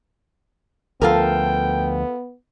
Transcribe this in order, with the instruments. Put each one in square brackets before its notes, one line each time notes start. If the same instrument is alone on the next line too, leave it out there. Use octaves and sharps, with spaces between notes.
[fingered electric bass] D2 F3 [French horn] B3 [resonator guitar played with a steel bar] F4 A4 A#4 [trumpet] G5